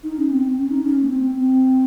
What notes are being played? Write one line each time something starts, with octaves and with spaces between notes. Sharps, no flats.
D#4
C#4
C4
C4
C#4
D#4
C#4
A#3
C4
C4